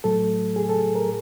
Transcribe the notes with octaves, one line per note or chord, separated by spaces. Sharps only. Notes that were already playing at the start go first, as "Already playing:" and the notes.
A2 F#3 A3 A4
G#4
A4
A#4